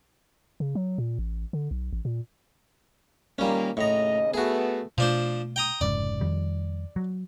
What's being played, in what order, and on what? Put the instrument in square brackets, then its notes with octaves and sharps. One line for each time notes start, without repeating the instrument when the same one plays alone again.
[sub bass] C#3
F#3
A#2
A1
D3
B1
A1
A#2
[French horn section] A#2 D#3 A#3 [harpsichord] G3 C#4
[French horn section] D#2 C#3 D#5 [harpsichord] A2 A#5
[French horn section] A3 B3 [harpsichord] F#4 G#4
[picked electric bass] B2 A3 [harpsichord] F3 D4 C5
[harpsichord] G5 A#5 D#6
[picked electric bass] F1 G#2 C#3 [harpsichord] D5
[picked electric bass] F2 D#3 G3
F#3